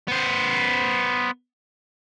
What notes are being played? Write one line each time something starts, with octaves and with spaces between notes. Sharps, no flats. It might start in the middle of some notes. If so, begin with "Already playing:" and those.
B3 C5